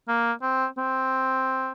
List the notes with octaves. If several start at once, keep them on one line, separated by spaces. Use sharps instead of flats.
A#3
C4
C4